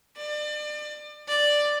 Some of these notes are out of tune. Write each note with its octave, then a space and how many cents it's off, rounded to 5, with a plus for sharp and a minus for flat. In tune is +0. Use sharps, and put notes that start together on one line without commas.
D5 +30
D5 +5